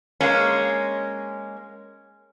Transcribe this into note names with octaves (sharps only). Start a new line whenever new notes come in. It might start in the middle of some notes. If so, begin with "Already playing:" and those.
G#3 A#3 C#4